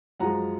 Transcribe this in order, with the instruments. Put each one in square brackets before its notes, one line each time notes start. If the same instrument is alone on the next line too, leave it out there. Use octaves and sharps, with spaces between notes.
[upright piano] F#2 F3 G#3 F#5 A#5